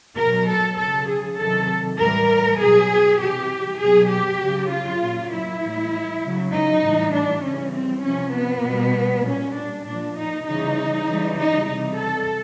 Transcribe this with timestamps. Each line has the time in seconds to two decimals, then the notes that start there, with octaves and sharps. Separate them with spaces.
0.17 B2 F#3 A#4
0.47 A4
0.77 C#3 F#3 A4
1.08 G#4
1.37 C3 D#3 F#3 A4
1.98 A2 E3 G3 A#4
2.59 B2 F#3 G#4
3.19 C3 E3 G3 G4
3.80 B2 F#3 G#4
4.10 G4
4.40 C#3 F#3
4.70 F4
5.01 A#2 F#3
5.32 E4
5.62 A2 E3 G3
6.22 C#3 F#3
6.52 D#4
6.82 A2 E3 G3
7.12 D4
7.42 C#3 E3 G3 C#4
7.73 C4
8.03 C3 F3 C#4
8.34 B3
8.63 B2 G3
9.24 A#2 G3 C#4
9.54 D4
9.84 A#2 F3 D4
10.15 D#4
10.45 C#3 E3 G3 D#4
11.05 C#3 E3 G3
11.36 D#4
11.66 C3 E3 G3 D#4
11.96 A4